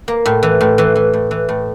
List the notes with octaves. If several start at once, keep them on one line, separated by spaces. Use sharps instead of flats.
A#3
A2
E3
A2
E3
E3
A2
E3
A2